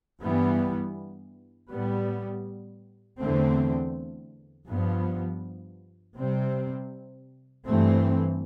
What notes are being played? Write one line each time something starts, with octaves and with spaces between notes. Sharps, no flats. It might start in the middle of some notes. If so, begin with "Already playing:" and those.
G2 E3 G3 B3
A2 G3 B3
E2 D3 A3 C4
G2 F3 B3
C3 G3 C4
G2 E3 A3 C4